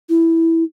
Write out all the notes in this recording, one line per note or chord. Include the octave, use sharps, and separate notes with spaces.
E4